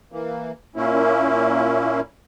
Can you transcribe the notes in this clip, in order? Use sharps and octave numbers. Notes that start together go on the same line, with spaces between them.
E3 A#3
A#2 A#3 C#4 E4